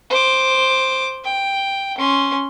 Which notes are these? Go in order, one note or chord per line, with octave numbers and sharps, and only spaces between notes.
C5 D6
G5
C#4 C6